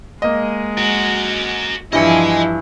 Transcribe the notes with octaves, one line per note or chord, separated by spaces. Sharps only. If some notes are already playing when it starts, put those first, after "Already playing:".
G#3 A#3 D#5
F#4 A#4
G2 E3 F3 E4 D#5 G#5 C#7